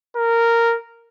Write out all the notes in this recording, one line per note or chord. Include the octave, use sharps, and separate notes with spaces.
A#4